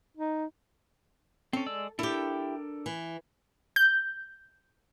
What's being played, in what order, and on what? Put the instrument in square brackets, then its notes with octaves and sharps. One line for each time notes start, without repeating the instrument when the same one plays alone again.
[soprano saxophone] D#4
[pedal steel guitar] C4 C#4 [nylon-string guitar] A4
[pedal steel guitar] G#3 D5 E6
[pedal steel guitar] D4 A4 A#4 [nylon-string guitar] E4 G4
[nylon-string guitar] E3
[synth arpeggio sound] G6